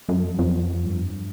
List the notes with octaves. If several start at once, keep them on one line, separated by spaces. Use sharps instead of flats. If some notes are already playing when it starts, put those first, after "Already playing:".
F#2
F2
F2
G2